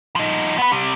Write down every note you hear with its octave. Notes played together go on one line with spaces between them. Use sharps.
F3 D#4
B3 B4
C3 G3